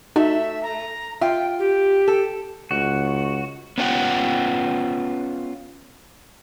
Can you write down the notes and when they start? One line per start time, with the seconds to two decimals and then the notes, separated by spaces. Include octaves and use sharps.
0.16 A3 D#4 F#4 E5
0.63 A#5
1.21 F4 E5 G5
1.59 G4
2.08 A4
2.71 C#2 F#4
3.78 B3 C#4 D4 F4 F#5 G5